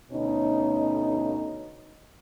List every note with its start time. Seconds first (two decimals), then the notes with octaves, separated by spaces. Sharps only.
0.12 D2 B2 C#4 D#4